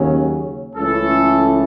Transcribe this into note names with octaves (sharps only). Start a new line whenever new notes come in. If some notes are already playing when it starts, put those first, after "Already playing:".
Already playing: D#2 C#3 F#3 C#4
C#2 C#3 E3 A3 C#4 A4